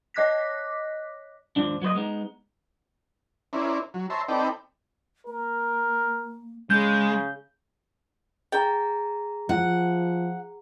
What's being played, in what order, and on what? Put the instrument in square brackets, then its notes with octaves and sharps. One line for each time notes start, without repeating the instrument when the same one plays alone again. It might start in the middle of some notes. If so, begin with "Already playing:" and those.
[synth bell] C#5 D#5 D6 F#6 A#6 B6
[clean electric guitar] D#2 G#2 F3 D4
F#3 A#3 C5 D#5
G#3 B3 D#4
[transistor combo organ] C#4 E4 A#4 C5 D5
F#3
C5 C#5 E5 A5 A#5 C6
C4 D#4 A4 B4 D5 G5
[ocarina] A#3 [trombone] A#4
[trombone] C#3 [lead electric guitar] G#3 [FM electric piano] G6
[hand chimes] G#4 A#5 [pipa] G5
[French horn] F3 [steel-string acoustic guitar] F#5